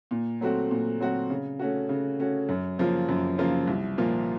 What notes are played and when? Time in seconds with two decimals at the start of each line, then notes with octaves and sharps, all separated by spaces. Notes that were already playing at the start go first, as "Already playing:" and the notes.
0.11 A#2
0.41 F#3 A3 C4 F#4
0.71 A#2
1.00 F#3 A3 C4 F#4
1.30 C#3
1.59 A3 C#4 F#4
1.89 C#3
2.19 A3 C#4 F#4
2.49 F#2
2.78 C#3 F3 A#3 F4
3.09 F#2
3.38 C#3 F3 A#3 F4
3.67 C2
3.98 A#2 F3 A#3 F4